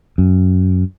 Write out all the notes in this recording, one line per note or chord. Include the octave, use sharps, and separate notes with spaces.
F#2